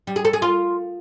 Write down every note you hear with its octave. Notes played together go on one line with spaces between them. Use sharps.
G3
G#4
A4
G#4
F4